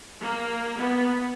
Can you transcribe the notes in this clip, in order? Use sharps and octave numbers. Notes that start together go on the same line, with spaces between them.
A#3
B3